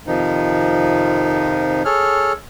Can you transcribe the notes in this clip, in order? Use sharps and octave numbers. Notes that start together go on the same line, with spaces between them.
F2 C3 D#3 F3 D#4
G#4 A4 C#5 F6